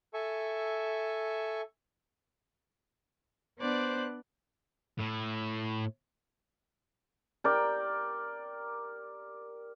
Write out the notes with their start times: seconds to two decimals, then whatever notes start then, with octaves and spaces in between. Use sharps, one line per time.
0.14 A4 E5 G#5 C#6
3.61 B3 D4 C5 D5 F#6
4.99 A2 E4
7.44 G4 A#4 D5 G5